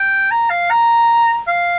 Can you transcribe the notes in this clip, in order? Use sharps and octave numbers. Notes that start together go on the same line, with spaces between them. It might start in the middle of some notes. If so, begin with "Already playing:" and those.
Already playing: G5
A#5
F5
A#5
F5